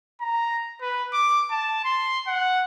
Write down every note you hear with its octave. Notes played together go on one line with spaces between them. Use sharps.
A#5
B4
D6
A5
C6
F#5